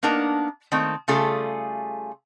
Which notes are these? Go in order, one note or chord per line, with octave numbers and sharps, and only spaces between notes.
A#3 B3 D4 D#4 A#4
D#3 A3 A#3 C4
C#3 G3 A3 F4 G#4 A4